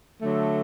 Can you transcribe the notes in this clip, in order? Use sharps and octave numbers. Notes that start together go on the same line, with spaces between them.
D3 F#3 A3